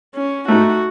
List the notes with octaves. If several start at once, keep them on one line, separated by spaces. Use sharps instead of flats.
C#4
A3 D#4 F#4